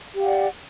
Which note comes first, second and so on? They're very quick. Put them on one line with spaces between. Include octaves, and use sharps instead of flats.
G4 F5 F#5 D5